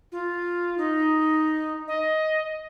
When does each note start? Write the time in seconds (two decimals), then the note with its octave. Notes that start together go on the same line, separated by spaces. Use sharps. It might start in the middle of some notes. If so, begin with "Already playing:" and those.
0.12 F4
0.78 D#4
1.88 D#5